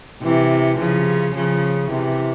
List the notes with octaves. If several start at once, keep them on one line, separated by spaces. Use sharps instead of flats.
C3 E3
C#3 F3
C#3 F3
C3 E3